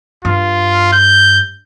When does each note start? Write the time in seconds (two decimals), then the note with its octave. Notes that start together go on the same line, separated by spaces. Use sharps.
0.25 G2 F4
0.93 G6